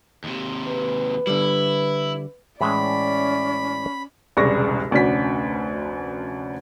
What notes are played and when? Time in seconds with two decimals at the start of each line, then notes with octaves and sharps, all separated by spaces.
0.24 D#2 C3
0.68 B4
1.27 D3 G3 E4
2.61 A2 E3 G#3 C#4 D5 B5
4.37 E1 C2 C#3 D5 C#6 A#6
4.91 F1 D2 C#4 D4 F#4 B6